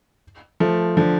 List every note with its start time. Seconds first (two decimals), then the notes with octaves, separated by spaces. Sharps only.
0.60 F3 A3
0.97 D3 F3